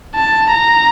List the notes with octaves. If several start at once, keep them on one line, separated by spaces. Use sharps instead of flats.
A5
A#5